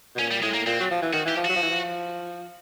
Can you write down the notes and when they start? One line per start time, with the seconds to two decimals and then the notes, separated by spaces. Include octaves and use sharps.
0.15 B2
0.19 A#2 C#4
0.31 G3
0.42 A2 G#3
0.54 A#3
0.66 A#2 C4
0.80 F#3
0.91 F3
1.02 E3
1.13 D#3 F#4
1.25 E3 G4
1.36 F3
1.45 F#3 F#4
1.56 F3
1.62 E3
1.70 F3